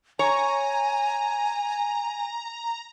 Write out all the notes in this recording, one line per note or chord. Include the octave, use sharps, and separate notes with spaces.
C#5 G#5 A#5